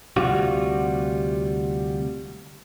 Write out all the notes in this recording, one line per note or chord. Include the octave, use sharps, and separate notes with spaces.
D2 C3 G3 F4 F#4